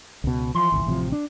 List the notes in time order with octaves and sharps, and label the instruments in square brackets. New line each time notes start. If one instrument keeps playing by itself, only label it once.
[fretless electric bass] C#2 B2
[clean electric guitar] E3 C6 [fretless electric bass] F3
[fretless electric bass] G#1 C#2
A1 C3 F3
D4